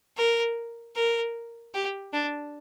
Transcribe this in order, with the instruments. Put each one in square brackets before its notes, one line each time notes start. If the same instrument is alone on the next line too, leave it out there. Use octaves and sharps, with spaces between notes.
[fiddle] A#4
A#4
G4
D4